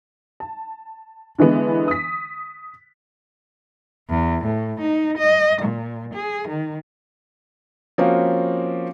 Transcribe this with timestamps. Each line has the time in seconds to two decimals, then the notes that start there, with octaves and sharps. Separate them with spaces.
0.40 A5
1.39 D3 E3 G#3 B3
1.88 D#6 B6
4.09 E2
4.45 A2
4.80 D#4
5.18 D#5
5.62 A#2
6.14 G#4
6.48 D#3
7.98 F3 A#3 C4 C#4 F#4